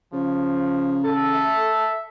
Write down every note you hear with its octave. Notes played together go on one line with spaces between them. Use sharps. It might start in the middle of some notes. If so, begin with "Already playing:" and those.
C#3 F3
A4
E5